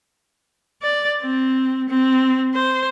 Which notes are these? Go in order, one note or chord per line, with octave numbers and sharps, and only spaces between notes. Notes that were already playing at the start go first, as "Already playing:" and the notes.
D5
C4
C4
C5